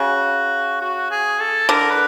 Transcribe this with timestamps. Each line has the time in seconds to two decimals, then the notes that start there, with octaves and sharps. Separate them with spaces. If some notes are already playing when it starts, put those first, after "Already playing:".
Already playing: C#3 F#4
0.81 F#4
1.11 G#4
1.40 A4
1.69 D3 A#4
1.90 B4